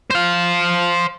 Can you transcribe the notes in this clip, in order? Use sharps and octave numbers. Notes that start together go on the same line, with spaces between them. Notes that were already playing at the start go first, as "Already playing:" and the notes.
C5 F5